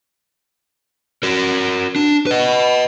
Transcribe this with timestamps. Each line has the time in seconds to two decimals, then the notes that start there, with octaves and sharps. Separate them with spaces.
1.23 F#4 A#4
1.96 D4
2.27 B4 D#5